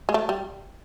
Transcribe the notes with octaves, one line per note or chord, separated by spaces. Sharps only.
G#3
A3
G3